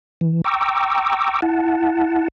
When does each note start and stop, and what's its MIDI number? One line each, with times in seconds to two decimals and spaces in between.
0.21 0.42 52
0.44 1.41 79
0.44 1.41 82
0.44 1.41 85
0.44 1.41 86
0.44 1.41 88
1.42 2.28 64
1.42 2.28 78
1.42 2.28 81